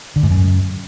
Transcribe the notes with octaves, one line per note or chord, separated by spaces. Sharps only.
D3
G#2
F#2